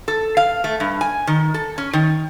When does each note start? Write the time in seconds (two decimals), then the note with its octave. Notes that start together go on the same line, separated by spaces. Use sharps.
0.08 A4
0.37 F5
0.64 A3
0.80 G2
1.01 G#5
1.27 D#3
1.54 A4
1.78 C#4
1.93 D#3